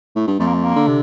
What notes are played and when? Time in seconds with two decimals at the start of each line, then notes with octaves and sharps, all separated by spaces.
0.16 A2
0.27 G2
0.39 F2 A3
0.47 A#3
0.55 A3
0.64 A#3
0.76 D3
0.87 C3